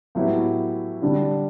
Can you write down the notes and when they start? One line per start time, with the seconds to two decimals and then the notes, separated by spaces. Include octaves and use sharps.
0.15 A2 F#3 B3 E4 G4
1.02 D3 G3 D4